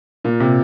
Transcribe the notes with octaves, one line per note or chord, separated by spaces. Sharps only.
A#2
C3